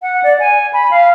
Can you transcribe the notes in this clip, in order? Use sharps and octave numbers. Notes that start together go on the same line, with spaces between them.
F#5
D5
G#5
B5
F5